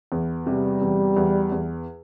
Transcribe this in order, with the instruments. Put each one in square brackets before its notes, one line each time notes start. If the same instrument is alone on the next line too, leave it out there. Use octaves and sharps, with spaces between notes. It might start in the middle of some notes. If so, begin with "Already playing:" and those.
[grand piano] E2
[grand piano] C3 [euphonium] G3
[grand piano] E2
E2
E2